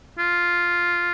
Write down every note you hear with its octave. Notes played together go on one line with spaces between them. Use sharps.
F4